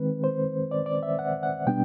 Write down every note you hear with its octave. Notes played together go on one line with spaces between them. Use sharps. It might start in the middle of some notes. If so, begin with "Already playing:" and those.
Already playing: D#3 G#3 C4 B4
C5
D5
D5
E5
F#5
F#5
B2 G3 B3 D4 G5